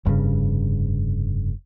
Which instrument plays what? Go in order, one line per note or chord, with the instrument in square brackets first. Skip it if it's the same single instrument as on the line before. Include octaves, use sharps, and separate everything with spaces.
[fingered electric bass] F1 G2 A#2 C#3